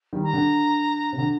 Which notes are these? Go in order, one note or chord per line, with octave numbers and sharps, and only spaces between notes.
D#3 G3
A#5
D3
C3
D3